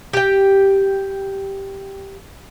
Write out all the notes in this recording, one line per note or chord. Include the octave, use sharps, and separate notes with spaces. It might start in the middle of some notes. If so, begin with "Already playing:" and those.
G4 G5